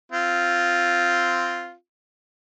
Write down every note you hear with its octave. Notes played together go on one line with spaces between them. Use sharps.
C4 F4